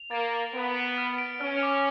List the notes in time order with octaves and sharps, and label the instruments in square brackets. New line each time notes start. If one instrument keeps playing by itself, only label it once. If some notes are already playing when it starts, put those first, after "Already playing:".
Already playing: [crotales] F7
[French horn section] A#3 [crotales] A6
[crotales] A6
[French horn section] B3 [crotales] D7
[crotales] D7
F6
D7
[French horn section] C#4 [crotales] F6
[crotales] D6